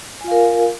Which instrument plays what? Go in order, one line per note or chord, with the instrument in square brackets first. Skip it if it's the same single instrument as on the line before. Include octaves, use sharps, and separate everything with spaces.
[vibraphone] G#5
F4
F5
A#4